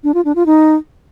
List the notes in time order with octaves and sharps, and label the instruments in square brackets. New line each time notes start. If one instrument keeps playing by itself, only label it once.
[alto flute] D4
F4
D4
F4
D#4